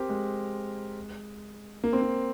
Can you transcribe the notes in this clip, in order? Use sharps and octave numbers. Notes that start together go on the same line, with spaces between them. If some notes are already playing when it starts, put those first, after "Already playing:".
Already playing: C4 G4 A#4
G#3
A#3
C4
A#3